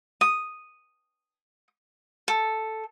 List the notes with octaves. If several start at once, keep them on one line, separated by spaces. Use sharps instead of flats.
D#6
A4